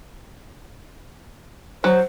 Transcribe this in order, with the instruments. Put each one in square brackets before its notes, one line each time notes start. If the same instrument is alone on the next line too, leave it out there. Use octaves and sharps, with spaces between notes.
[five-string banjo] F#3 [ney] C5